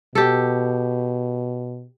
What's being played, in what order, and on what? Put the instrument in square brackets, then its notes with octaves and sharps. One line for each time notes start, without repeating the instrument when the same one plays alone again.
[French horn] B2 [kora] G4 A4